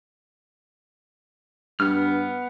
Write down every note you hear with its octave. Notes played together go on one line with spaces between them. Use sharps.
G2 B3 F6